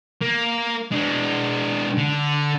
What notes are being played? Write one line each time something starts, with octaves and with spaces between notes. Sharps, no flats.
A#3
G#3 D4
D3